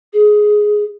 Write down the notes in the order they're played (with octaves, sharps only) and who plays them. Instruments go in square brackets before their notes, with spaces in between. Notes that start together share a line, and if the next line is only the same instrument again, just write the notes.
[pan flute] G#4